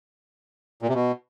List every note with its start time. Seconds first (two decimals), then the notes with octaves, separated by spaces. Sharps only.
0.82 A#2
0.88 C3
0.94 B2